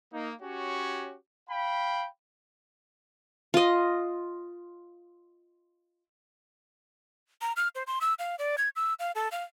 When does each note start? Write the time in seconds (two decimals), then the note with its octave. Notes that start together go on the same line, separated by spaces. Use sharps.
0.13 A#3 D#4
0.42 C#4 F#4 G4 C#5
1.50 F5 G5 B5
3.54 F4 D#5
7.41 A#5
7.56 F6
7.75 C5
7.87 C6
8.01 E6
8.19 F5
8.39 D5
8.58 G#6
8.76 E6
8.99 F5
9.15 A4
9.32 F5